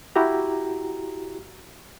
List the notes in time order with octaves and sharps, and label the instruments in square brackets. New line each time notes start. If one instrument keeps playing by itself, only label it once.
[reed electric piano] E4 F#4 G4 A#5